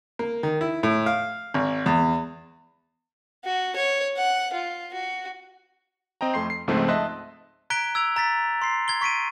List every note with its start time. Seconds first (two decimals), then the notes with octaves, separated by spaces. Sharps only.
0.19 A#3
0.43 D#3
0.61 E4
0.83 A2
1.06 F5
1.54 G#1
1.86 E2
3.45 F#4
3.76 C#5
4.17 F#5
4.53 F4
4.94 F#4
6.21 C4 D#5 G5 A#5
6.34 F2 A3 C6 C7
6.50 C7
6.68 C#2 G#2 F3 A3 C4
6.88 D#5 E5 A5 C6 F#6
7.70 A#5 F#6 G#6 B6 D7 G7
7.95 E6 G#6 D7 F7
8.16 A#5 A6 B6
8.62 C6 C7
8.88 G#6 G7
9.01 C#6 B6 D7 D#7